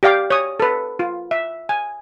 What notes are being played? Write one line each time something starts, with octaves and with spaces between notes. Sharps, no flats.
G4 D5 F5 G5 D6
C#5 D#6
A4 B4
F4
E5
G#5